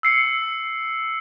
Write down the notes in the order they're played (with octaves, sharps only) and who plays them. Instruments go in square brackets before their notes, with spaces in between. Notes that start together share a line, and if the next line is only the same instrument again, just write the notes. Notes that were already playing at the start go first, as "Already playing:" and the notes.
[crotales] E6 C7 C#7